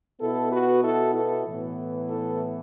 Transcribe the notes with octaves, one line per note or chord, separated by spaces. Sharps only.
B2 B3 E4 A4
F#4 B4
E4 A4
E4 A4
A2 E3 B3
E4 A4